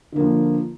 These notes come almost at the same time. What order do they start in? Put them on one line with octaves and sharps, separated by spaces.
D3 A#3 F3